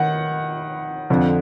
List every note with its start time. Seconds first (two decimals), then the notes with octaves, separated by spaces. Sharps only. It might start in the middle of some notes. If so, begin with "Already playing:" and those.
Already playing: D#3 F#5
1.10 F2 D3 F3